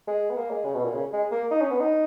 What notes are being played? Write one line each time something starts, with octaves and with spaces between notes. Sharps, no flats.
G#3
B3
A#3
G#3
C#3
B2
A#2
C#3
G#3
A#3
D#4
C#4
B3
D#4